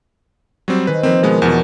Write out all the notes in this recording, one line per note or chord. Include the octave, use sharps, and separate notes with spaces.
F#3 G3 C4
D#3 C4 G#4 B4
F3 A#3 C4 B4
B2 G#3 B3
E2 B2